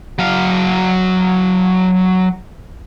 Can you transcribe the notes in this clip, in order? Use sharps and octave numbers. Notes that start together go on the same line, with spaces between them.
F#3 F5